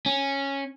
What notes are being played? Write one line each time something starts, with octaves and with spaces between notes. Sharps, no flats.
C#4